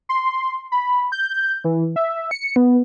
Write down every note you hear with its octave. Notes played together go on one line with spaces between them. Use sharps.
C6
B5
G6
E3
E5
C#7
B3